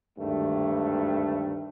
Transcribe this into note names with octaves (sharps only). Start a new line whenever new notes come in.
G#1 D2 G2 D#3 A3